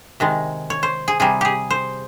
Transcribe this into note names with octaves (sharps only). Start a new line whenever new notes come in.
C3 D#3 G#3
C#5
C5
G#4
C3 G3 G#4
G4 G#4
C5